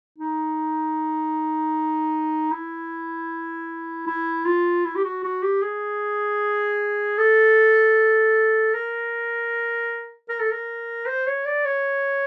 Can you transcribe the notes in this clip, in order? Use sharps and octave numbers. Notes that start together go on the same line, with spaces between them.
D#4
E4
E4
F4
E4
G4
F#4
F#4
G4
G#4
A4
A#4
A#4
A4
A#4
C5
C#5
D5
C#5